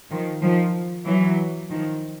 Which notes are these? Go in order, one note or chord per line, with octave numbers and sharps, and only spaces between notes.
D#3 F3
D#3 F3
E3 F#3
D#3 F3